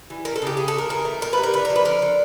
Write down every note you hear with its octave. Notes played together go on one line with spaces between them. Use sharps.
E3
A3 A#4
A4
C#3 G4
G#3 G#4
A4
G#3 A#4
E3 A#4
A3
A#2 A#4
G3 B4
A#4
D3 B4
A#4
F3
B4
D3 A#4
D3